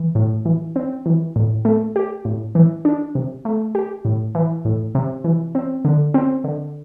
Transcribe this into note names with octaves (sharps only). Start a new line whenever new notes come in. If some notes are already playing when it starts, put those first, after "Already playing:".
Already playing: E3
A2
E3
C4
E3
A2
A3
G4
A2
E3
D4
C3
A3
G4
A2
E3
A2
C3
E3
C4
D3
C4
D3